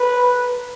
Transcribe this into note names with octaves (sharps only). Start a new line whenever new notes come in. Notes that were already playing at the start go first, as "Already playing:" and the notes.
Already playing: B4